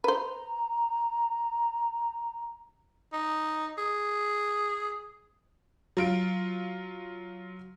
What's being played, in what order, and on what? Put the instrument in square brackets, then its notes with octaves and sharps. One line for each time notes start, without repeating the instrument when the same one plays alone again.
[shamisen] B4 C5 [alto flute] A#5
[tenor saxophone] D#4
G#4
[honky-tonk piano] F#3 F4 D7